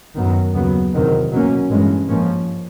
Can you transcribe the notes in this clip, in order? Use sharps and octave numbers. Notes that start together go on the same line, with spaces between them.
F#2 D#3 F#3 B3
D#2 C#3 F#3 B3
E2 C3 D#3 F#3
B2 F#3 A#3 C#4
G2 E3 G#3 C#4
G#2 F3 A#3 C#4